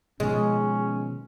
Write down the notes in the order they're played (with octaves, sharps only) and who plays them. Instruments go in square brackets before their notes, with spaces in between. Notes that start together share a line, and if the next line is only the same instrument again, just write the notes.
[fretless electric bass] B2 D#3 F3 [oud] G#3 [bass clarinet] C#4